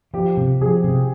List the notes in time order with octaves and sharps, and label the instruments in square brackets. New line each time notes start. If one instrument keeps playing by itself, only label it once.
[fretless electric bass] F3 [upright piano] G4
[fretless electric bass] C3
[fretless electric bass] F3 [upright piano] G#4
[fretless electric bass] C3